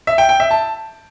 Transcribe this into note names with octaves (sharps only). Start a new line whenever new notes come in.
E5
G5
G5
E5
A5